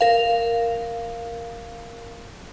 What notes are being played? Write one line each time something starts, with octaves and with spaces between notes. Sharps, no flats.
A#4 F5